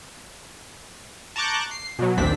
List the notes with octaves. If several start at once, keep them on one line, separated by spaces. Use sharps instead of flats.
A5 A#5 C#6 D6 F#6 G6
C7
B2 F#3
A#1 D#2 C4 D4 B6